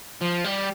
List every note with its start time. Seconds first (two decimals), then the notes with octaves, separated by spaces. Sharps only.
0.21 F3
0.44 G3